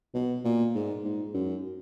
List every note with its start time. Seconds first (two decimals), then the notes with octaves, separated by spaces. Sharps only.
0.14 B2
0.44 A#2
0.75 G#2
1.04 G#2
1.34 F#2